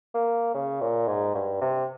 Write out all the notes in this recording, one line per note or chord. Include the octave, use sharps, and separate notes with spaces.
A#3
C#3
A#2
G#2
G2
C3